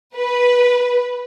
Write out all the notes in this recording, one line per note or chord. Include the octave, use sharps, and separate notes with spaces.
B4